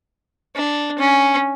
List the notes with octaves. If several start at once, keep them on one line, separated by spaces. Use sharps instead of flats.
D4
C#4